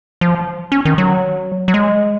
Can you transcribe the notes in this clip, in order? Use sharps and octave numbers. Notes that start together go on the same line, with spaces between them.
F3
C#4
D#3
F#3
F#3
G#3